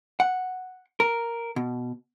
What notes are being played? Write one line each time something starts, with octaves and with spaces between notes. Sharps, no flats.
F#5
A#4
B2